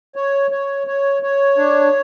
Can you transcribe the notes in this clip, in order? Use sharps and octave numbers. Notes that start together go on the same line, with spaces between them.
C#5
C#5
C#5
C#5
D4